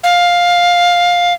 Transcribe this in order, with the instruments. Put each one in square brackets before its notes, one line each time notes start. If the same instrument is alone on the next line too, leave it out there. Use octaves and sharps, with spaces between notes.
[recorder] F5